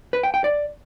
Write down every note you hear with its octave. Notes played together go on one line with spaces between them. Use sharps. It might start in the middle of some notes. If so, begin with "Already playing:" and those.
B4
G5
G5
D5